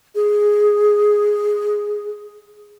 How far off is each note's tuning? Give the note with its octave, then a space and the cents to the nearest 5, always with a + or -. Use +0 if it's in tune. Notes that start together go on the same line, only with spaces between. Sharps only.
G#4 +0